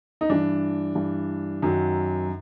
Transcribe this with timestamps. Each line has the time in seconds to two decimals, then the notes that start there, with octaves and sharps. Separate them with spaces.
0.21 D#4
0.29 G2 E3 D4
0.95 G2 E3
1.62 F#2 D#3 F#3